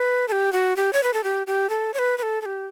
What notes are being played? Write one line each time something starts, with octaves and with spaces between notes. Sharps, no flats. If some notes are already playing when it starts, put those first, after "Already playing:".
Already playing: B4
A4
G4
F#4
G4
C#5
B4
A4
G4
G4
A4
C#5
B4
B4
A4
A4
G4